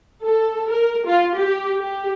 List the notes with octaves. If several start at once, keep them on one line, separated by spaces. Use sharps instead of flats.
A4
A#4
F4
G4
G4